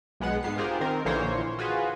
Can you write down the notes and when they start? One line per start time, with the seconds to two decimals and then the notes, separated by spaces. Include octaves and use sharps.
0.20 B1 G#3 B3 F#5
0.43 G#2 B3 C7
0.58 F4 G4 G#4 A#4 C5
0.80 D#3 C4 A#4
1.05 A#1 D3 E3 A#3 C5 C#5
1.59 F4 F#4 G#4 B4